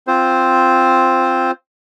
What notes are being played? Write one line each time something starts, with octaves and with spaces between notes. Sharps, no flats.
C4 F4 C5